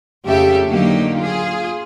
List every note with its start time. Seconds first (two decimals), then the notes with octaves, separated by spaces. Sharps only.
0.25 F2 C#3 A3 G4 A4 E5
0.68 D3 F#3 A#3 D#4 G4
1.17 F4 G#4